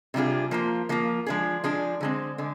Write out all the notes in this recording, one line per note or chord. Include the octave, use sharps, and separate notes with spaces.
C3 G3 D4 F4 G#4
F3 A#3 F4
F3 A#3 F4
F3 G#3 D4 G#4
F3 G#3 D4 G#4
D3 G#3 C4
D3 G#3